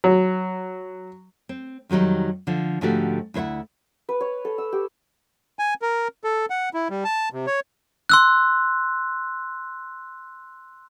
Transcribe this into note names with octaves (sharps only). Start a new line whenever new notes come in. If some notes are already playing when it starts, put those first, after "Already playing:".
F#3
C4
F2 D#3 F#3 G3 D#4
D3 F3
G#2 D3 F3 A3 F#4 G4
D2 E4 C5 E5 F#5
B4
C#5
A4
E6
G4
G#5
A#4
A4
F#5
E4
G3
A5
C3
C#5
C6 E6 F#6